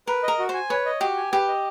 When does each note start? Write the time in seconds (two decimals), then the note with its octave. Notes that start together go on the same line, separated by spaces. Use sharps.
0.07 A#4 B4
0.23 A#4 D#5
0.39 F#4
0.49 C5 G#5
0.70 B4 C#5
0.86 D#5
1.01 F#4 G4
1.17 G#5
1.32 G4 B4
1.48 D#5